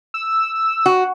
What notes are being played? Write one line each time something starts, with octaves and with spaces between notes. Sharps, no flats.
E6
F#4